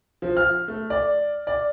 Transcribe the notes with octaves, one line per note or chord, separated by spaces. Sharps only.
F3
F6
A3
D5
D5